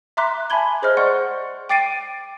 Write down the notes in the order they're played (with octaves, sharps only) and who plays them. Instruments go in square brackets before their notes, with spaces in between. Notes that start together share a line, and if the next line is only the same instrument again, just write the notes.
[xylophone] E5 A#5 C6 D6 F#6 B6
E5 G#5 A5 B5 G#6 G7
G#4 C5 D#5 F6 F#6
C5 D5 F#5 C6 C#6 C#7
G5 D6 A6 C7 D7 D#7